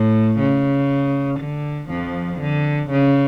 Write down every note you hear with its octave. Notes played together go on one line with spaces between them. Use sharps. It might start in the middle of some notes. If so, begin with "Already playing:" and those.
Already playing: A2
C#3
D3
F2 F3
D3
C#3